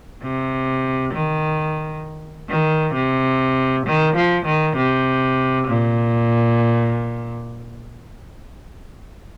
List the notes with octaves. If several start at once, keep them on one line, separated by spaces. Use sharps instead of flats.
C3
D#3
D#3
C3
D#3
F3
D#3
C3
A#2